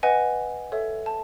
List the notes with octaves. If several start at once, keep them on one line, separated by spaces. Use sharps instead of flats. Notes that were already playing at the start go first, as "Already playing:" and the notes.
B4 D#5 F#5 G#5
A4 C#5 E5
A5